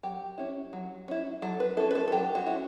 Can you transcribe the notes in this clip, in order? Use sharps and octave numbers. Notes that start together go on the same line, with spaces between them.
F#3 G4
C#4 E4
F#3
C#4 E4
F#3 A4
B4
C#4 E4 A4
B4
A4
A4
F#3 G4
F#4
C#4 E4